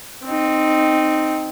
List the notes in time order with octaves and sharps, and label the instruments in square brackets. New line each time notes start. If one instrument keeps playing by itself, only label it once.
[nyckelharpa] C4 D#4